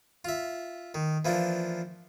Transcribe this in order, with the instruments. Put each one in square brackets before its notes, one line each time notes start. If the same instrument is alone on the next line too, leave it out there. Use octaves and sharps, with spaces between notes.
[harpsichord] F4 E5
D#3
E3 F3 A#3 D4